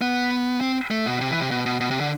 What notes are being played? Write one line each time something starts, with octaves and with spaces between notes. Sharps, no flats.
B3
C4
A3
B2
C3
E3
C3
B2
B2
B2
C3
D3